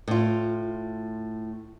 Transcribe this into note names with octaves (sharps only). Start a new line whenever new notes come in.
A2 F4